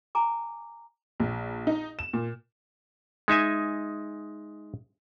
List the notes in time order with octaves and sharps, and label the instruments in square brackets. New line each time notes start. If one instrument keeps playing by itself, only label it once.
[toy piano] G#5 A#5 D6
[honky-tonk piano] A#1
D#4
E7
A#2
[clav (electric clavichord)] G#3 D#4 E5 G#5